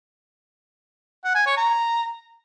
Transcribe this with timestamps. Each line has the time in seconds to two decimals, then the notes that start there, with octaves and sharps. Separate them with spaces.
1.24 F#5
1.35 G#5
1.46 C#5
1.57 A#5